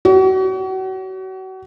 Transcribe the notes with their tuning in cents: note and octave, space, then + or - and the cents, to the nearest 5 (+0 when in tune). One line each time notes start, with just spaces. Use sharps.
F#4 +35 C#5 +30